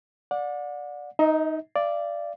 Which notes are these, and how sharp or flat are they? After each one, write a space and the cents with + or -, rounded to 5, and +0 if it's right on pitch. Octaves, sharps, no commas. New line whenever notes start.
D5 +0 F#5 -35
D#4 +0 D#5 +45
D5 +0 F5 -35